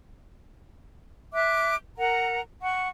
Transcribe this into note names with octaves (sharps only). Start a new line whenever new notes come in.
E5 D6 F#6
A#4 F#5 A#5
F#5 C#6